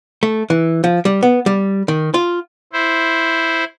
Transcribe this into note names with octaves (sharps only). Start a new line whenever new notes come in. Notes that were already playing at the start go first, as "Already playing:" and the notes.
A3
E3
F3
G3
B3
G3
D#3
F4
E4 C5